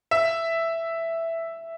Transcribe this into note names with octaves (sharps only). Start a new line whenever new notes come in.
E5